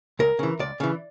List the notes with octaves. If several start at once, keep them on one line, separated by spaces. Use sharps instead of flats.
C#2 A#4
C#3 E3
C#2 D5
C#3 E3